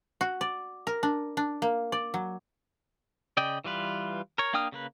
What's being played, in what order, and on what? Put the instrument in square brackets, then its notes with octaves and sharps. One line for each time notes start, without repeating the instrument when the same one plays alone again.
[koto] F#4
D5
A#4
D4
D4
A#3
D5
F#3
[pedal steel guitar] C#3 D5 D#5 G5
E3 G3 F4 B4
A#4 C#5
A#3 D4 G5 D#6 F6
C#3 A#3 B4